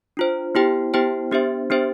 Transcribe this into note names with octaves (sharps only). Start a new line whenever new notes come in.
D4 F4 C5
B3 E4 G4 C5 G5
B3 E4 G4 C5 G5
B3 D4 G4 C5 E5
B3 D4 G4 C5 E5